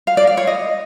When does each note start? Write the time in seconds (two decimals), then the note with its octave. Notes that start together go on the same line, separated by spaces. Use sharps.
0.07 F5
0.17 D5
0.27 F5
0.37 C#5
0.47 D#5